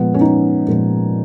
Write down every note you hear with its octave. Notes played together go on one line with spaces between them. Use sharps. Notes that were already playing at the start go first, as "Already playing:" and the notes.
Already playing: A#2 F3 G#3 B3
C#4
D#4
A#2 F3 G#3